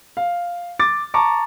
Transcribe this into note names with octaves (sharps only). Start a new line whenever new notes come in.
F5
D6 A6
A5 A#5 C#6 D6